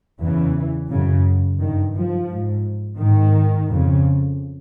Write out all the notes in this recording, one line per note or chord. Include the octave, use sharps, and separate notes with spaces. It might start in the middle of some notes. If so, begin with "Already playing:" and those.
E2 C#3 E3
F#2 C#3
G2 D#3
F3
G#2
G#2 D#3
F2 C#3